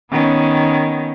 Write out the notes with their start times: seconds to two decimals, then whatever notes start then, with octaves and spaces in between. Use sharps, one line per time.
0.11 D#3 B3 C#4